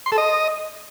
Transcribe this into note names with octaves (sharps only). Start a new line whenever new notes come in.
C6
A4
D#5